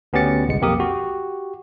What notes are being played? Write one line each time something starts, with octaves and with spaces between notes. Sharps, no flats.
D2 B3 C#4 G4 A6 C#7
G1 C2 G#3 C#7
B1 F2 A#3 G4 A#4 D#6
F#4 G4